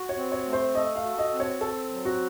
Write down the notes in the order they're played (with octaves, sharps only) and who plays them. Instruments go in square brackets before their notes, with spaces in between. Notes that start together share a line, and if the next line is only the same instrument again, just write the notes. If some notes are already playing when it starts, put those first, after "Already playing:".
Already playing: [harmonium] F#4
[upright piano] C#5
[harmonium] C4
[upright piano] C#5
[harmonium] A3
[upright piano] C5
[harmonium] A4 [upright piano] D#5
[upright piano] F5
[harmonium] F#4
[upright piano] D#5
[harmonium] C4
[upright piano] C#5
[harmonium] C4 [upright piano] A4
[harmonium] F#3
[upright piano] F#4